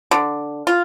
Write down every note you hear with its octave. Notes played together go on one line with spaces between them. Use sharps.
D3
F4